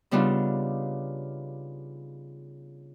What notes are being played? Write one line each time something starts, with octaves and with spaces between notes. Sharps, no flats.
C#3 G3 B3 D4 D#4 F4